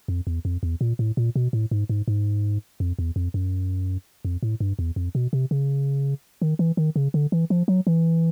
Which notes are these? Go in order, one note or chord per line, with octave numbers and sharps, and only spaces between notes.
F2
E2
F2
E2
A#2
A2
A#2
B2
A2
G#2
G#2
G#2
F2
E2
F2
F#2
F2
A2
G2
E2
F2
B2
C3
C#3
D#3
E3
D#3
C#3
D3
E3
F3
F#3
E3